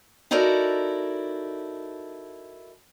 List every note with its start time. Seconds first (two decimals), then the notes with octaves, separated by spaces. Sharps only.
0.31 D#4 E4 F#4 A4 A#4 D5